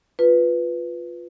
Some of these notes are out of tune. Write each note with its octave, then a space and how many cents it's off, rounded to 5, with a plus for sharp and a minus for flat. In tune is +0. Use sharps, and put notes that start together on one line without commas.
F4 +10 B4 +0